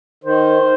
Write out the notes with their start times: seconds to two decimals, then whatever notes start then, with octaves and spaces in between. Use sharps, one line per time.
0.24 D#3 C5